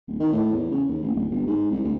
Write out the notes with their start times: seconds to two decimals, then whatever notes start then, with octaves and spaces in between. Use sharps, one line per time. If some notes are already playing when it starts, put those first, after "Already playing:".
0.08 D1
0.20 D#3
0.32 A2
0.53 E2
0.71 C#3
0.89 D#2
1.02 A1
1.14 D1
1.30 G1
1.47 G#2
1.71 C2
1.84 D2